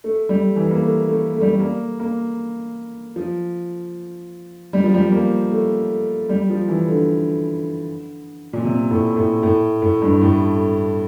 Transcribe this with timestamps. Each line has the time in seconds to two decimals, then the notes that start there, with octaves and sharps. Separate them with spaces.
0.04 A3
0.29 G3
0.56 E3
0.71 A#3
0.82 A3
1.08 A3
1.33 A3
1.41 G3
1.49 A3
1.60 A#3
2.00 A#3
3.16 F3
4.73 G3
4.84 F3
4.94 G3
5.12 A#3
5.51 A3
6.29 G3
6.50 F3
6.68 E3
6.88 D3
8.53 A#2
8.64 C3
8.91 A2
9.16 A2
9.43 A2
9.82 A2
10.02 G2
10.21 A2